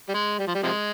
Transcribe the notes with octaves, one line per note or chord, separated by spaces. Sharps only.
G3
G#3
G3
F3
G3
C3 F3 G#3